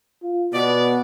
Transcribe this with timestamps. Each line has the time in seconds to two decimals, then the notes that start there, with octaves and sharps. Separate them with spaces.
0.23 F4
0.54 B2 B3 D5